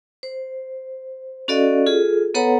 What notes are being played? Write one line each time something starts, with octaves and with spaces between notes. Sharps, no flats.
C5
C#4 F#4 A4 D5 D#5 F5
F4 G#4 A4
B3 A4 B4 C#5 F#5 A#5